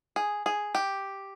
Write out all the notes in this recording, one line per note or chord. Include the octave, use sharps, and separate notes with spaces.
G#4
G#4
G4